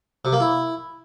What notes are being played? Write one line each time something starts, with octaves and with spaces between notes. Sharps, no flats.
C3
A#3
E4